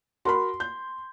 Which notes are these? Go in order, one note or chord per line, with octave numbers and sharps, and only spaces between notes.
F#4 A#4 B5 C6
G6